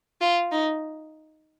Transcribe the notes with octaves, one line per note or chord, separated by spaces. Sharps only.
F4
D#4